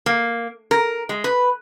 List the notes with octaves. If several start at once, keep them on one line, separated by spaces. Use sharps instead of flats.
A#3
A#4
G#3
B4